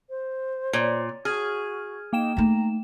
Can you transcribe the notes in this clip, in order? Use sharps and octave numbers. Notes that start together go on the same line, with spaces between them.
C5
A#2 C#5
F#4 G#4 F6 G#6
A#3 D#4 G5 E7
A3 D#4 A#5